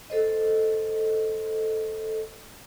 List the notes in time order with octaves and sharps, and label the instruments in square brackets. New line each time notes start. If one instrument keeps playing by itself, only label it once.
[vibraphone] A4 C5 D#5